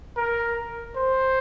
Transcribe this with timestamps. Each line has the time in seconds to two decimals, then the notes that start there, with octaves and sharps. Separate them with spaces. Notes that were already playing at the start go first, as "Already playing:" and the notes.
0.17 A#4
0.96 C5